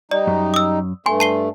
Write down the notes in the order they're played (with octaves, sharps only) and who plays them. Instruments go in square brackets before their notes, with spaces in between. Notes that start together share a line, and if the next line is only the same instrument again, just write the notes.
[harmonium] G3 D#4 [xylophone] D5
[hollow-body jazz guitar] F#2
[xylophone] D#6 E6
[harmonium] G2 A3 [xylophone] G#5 [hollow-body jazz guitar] C6
[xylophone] A5 C7 G7